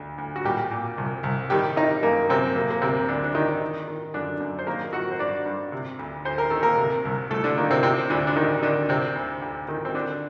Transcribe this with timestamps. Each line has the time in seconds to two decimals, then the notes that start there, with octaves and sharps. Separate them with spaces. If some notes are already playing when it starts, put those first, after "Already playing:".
Already playing: D2
0.18 D2
0.36 F#4
0.44 A#2 G3 G4
0.71 A#2
0.98 C2
1.23 C2
1.50 D#3 G3 G4
1.76 D#3 D#4
2.03 F#2 A#3
2.30 F#2 C3 C4
2.56 C3 A#3
2.70 A#3
2.82 D2 C3 C4
3.08 D2 D3 D4
3.24 D4
3.35 D#3 D#4
3.61 D#3
3.88 D#3
4.14 F#2 D3 D4
4.40 F#2
4.59 C5
4.67 D#3 A#3 A#4
4.93 D#3 F#4 F#5
5.11 C5
5.19 G2 D4 D5
5.46 G2
5.72 C3
5.99 D2
6.25 D2 C5
6.38 A#4
6.50 D#3 A4
6.63 A#3 A#4
6.77 C3
7.05 C2
7.30 C2 A3 A4
7.44 D3 D4
7.57 D#3 A#3
7.70 C3 C4
7.83 C3 C4
8.10 D2 D3 D4
8.27 D4
8.36 D2 D#3 D#4
8.63 D3 D#3 D4
8.89 C3 C4
9.16 D2
9.42 D2
9.68 D#3
9.85 C4
9.94 D3 D4